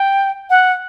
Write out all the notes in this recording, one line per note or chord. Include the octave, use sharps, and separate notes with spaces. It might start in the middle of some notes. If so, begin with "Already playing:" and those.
Already playing: G5
F#5